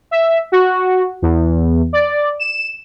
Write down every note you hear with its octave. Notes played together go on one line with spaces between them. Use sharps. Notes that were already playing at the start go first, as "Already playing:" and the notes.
E5
F#4
E2
D5
E7